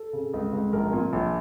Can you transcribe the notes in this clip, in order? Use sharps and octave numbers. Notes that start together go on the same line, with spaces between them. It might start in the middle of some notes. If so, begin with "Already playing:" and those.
Already playing: A4
C#3
C#2
C#2
A#1 A#4
A#2
A#1